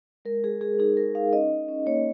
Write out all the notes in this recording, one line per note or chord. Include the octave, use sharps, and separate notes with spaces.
G#3 A#4
G#3 G#4
G#3 G#4
D#4 G#4
G#3 A#4
D#4 F5
C#4 D#5
C#4
C#4
A#3 C#5